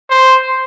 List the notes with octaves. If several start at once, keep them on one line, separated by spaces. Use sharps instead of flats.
C5